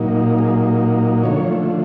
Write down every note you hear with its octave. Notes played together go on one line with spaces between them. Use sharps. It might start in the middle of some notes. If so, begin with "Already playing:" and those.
Already playing: A#2 F#3 A#3 D#4
G#4
D3 F3 A3 C#5